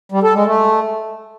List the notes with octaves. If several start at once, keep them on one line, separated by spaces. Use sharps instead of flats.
G3
A4
G#3
A3